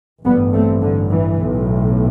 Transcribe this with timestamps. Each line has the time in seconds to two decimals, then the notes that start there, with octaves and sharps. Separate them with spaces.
0.24 A1 G2 G3 B3
0.52 A3 C4
0.81 D3
1.10 E3
1.38 B1 A2